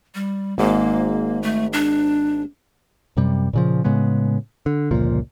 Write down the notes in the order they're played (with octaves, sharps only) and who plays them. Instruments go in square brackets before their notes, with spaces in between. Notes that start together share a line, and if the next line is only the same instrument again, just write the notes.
[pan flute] G3
[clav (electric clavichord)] G#1 G#2 [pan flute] A#3
[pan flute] A3
D4
[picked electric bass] F#2 C3 G3
A#2 C#3 F3
A2 C#3 G#3 B3
D3
G1 C#2 A#2 F3